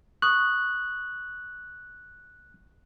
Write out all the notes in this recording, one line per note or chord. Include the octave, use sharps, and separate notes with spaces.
C#6 D#6 F#6